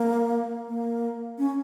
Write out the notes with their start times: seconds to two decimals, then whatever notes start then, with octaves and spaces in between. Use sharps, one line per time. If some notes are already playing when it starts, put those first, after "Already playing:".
Already playing: A#3
0.69 A#3
1.38 C#4